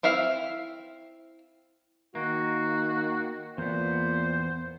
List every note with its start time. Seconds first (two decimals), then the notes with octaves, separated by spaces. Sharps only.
0.03 C4 E4 E5 F5
2.15 D#3 A#3 F#4
3.58 E2 A#2 B3 C5